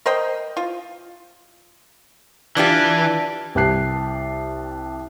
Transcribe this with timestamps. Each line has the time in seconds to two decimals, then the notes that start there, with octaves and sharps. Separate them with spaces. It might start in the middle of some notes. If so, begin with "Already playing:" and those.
0.06 A#4 C5 D#5 G5
0.57 F4
2.57 E3 D4 F4 G4 B4 D5
3.55 C2 G4 A5 F#6 C7